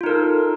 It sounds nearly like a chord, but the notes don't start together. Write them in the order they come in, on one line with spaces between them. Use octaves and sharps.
F4 D#4 A#4 A4